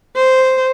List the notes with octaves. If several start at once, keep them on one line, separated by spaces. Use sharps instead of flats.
C5